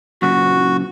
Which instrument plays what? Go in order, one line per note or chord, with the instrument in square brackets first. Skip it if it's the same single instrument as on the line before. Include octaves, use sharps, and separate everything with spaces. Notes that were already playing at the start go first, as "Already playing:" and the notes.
[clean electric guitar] F#2 A#2 C#3 [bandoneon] F#4